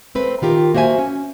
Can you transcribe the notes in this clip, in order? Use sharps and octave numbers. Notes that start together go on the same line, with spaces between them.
A3 C4 B4
D#3 F4 G4 A#4
A#3 F#4 C5 E5 G#5
C#4